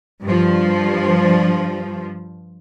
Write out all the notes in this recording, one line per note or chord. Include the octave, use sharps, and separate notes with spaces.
G2 F3